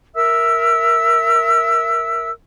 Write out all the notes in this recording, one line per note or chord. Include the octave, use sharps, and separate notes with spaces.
A#4 E5 E6